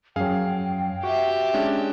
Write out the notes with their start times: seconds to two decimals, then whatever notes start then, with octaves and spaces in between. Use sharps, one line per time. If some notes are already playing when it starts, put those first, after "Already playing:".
0.16 F#2 F#3 G#4 F5 G5
1.03 F#4 G4 E5
1.54 G#3 C#4 D4